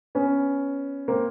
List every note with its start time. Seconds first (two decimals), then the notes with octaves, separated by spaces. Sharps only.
0.15 B3 C#4
1.08 A#3 C4